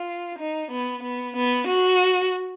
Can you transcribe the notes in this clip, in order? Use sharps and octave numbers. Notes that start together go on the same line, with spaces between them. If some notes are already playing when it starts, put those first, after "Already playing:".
Already playing: F4
D#4
B3
B3
B3
F#4